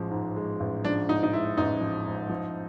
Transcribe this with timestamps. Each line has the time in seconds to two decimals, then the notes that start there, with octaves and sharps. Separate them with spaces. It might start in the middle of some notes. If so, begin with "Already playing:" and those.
Already playing: A1 F3 G#3
0.11 G#2
0.36 G#3
0.60 A1
0.85 F3 D4
1.08 G#2 D#4
1.23 D#4
1.33 G#3 E4
1.57 A1 D#4
1.81 F3
2.06 G#2
2.29 F3